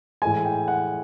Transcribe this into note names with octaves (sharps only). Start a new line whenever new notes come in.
A2 E3 G#3 G#5
G5
F#5